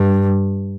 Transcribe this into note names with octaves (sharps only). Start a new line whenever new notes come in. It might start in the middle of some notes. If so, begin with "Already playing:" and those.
Already playing: G2